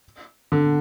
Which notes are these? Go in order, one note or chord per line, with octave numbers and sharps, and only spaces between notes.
D3